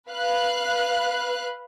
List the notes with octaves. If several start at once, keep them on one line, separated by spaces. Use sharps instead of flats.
B4 F5 F#6